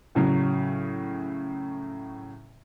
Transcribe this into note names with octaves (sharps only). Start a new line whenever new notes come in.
A2 C#3 F#3